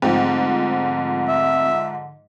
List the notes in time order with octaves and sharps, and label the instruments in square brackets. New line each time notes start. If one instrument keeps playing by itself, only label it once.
[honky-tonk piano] G#2 F3 [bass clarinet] D3 [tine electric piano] A3 C4 G5
[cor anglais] E5